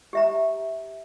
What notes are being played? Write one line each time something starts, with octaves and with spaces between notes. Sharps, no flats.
G4 E5 A#5